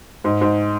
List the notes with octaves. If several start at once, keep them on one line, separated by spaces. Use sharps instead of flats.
G#2
G#2